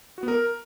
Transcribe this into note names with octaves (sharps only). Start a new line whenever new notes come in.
F#4
B3
A#4